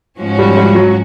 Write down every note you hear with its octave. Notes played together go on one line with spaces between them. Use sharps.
G#2 F3 G#3 C#4 F#4
G3
G3
F#3